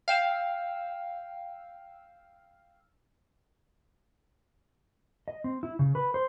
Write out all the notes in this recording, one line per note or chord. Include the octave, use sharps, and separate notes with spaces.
F5 G5 E6
D#5
C4
E4
C#3
B4
C5